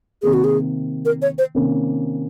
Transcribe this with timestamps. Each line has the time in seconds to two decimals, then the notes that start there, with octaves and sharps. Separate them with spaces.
0.22 C3 D#3 A#3 G#4
0.33 F#4
0.44 G#4
1.05 A#4
1.22 C#5
1.38 C5
1.55 C3 D#3 A#3 C#4